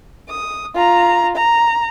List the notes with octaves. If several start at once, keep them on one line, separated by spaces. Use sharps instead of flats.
D#6
F4 A#5
A#5